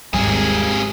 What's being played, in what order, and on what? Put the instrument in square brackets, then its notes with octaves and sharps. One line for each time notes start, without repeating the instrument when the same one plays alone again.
[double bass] G#1 [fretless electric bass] D#2 F#3 G3 [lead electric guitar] C3 G#4 [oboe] G#5